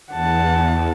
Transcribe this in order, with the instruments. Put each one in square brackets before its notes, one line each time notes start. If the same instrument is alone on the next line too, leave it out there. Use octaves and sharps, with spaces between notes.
[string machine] E2 [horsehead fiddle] F#5 A5